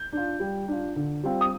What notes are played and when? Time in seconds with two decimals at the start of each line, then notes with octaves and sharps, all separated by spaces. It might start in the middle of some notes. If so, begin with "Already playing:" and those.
Already playing: G6
0.13 D4 F4
0.40 G3
0.68 D4 F4
0.96 D3
1.24 G3 C4 F4
1.41 D#6